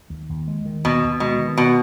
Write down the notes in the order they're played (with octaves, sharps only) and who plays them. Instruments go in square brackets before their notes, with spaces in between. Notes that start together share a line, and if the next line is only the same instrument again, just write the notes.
[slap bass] D#2
D#2
G#3
D#3
[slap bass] D#2 [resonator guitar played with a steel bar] B2
[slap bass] D#2
[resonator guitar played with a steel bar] B2 [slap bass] G#3
[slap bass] D#3
[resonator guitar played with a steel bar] B2